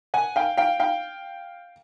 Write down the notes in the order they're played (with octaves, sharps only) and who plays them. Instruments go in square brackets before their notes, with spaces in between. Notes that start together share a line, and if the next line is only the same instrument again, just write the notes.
[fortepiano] F#5 G#5
F5 G5
F5 G5
F5 G5